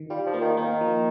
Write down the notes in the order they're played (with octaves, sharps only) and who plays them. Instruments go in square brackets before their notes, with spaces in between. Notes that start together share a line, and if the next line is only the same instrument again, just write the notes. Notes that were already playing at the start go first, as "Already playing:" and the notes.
Already playing: [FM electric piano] D#3
[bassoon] G3 [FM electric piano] F4
[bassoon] F3
[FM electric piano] A#3
[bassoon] D#3
[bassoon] D#3 [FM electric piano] A#3
[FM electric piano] F3